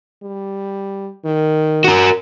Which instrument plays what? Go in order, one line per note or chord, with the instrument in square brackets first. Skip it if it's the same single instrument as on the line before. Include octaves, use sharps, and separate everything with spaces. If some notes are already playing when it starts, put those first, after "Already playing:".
[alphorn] G3
D#3
[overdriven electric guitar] F#4 A#4